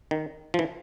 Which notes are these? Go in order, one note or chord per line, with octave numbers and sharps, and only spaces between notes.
D#3
F3
E3